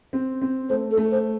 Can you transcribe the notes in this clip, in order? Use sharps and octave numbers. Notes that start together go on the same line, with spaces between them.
C4
C4
A3 C5
A4
A3
C5